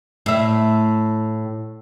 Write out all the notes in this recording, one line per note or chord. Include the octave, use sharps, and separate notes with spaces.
A2 E5